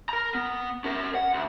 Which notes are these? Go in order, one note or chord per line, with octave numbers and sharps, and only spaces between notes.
A#4 A#5
B3
C#4 A#4
F#5
D2